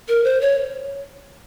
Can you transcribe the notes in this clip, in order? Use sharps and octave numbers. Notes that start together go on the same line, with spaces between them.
A#4
C5
C#5